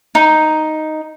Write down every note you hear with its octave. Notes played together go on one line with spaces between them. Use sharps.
D#4